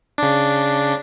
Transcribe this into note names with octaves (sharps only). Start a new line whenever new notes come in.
C#3 D4